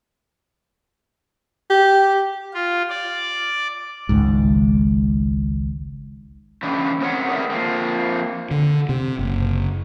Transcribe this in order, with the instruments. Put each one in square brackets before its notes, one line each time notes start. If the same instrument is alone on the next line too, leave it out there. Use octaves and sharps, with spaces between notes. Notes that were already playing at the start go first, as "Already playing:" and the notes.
[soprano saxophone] G4
[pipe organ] F4
D5
[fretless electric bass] G#1 C#2 G#2
[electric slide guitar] C#3 E3 G3 D4
C4 A#4 C#5 F#5
G4 G#4 A#4 B4 D5 E5
F3 A#3 C4
[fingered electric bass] D3
C3
F#1